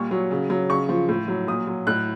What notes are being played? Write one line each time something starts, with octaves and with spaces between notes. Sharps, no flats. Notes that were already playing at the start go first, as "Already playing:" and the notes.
Already playing: A#2 G3 C#6
F#3
C#3
F#3
C#3 C#6
F3
A2
F#3
A#2 D#6
F#3
A2 F#6